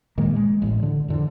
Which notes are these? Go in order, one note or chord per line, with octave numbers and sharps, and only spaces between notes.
A#2 D#3 G#3 A#3
G#3
A1 A2
D3
F2 D3 E3